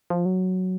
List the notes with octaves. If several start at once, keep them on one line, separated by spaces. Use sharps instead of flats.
F3
F#3